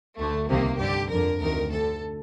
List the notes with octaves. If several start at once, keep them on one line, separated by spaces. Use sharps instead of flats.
D2 D3 A3
C2 C3 D#3 A#3
G2 D3 G4
F2 D3 A#4
D2 C3 D#3 A#4
D2 D3 A4